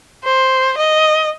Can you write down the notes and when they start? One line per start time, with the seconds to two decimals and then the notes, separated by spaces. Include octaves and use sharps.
0.24 C5
0.78 D#5